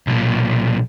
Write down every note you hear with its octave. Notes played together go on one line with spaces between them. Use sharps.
B1 A#2